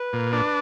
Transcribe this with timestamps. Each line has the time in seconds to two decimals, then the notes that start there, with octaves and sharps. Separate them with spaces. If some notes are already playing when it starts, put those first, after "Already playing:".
Already playing: B4
0.13 A#2
0.33 D4